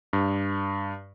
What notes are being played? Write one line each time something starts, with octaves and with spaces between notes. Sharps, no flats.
G2